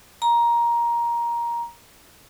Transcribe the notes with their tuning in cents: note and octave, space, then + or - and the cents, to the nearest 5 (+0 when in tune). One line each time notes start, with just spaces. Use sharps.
A#5 +15